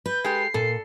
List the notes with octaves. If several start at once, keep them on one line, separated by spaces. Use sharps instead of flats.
B4 G6
G#3 G4 A4 C7
A#2 A4